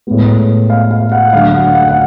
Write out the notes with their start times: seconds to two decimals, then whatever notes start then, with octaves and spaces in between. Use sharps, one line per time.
0.07 A2 G#3 B3
0.70 F5
0.91 F5
1.12 F#5
1.33 D3 F#3 A3 F5
1.54 F#5
1.75 F#5
1.88 F#5